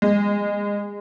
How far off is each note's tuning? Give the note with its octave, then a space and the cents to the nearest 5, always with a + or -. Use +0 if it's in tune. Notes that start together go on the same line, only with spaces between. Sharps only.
G#3 -25